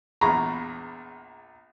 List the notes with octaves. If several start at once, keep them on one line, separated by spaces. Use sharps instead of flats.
A#1 E2 G#3 G#4 A#5 B5 C#6